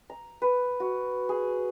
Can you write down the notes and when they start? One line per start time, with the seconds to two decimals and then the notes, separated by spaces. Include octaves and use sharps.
0.10 A#5
0.42 B4
0.80 F#4
1.29 G#4